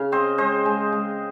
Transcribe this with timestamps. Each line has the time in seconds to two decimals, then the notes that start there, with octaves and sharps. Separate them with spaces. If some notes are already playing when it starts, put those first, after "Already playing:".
Already playing: C#3 F5
0.12 C4 C5 D#5
0.38 G#3 C5 D#5
0.66 G#3
0.92 G#3